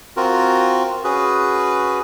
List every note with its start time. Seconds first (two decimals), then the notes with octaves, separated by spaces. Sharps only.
0.17 C4 F4 F#4 A#4
1.04 C#4 F#4 G#4 B4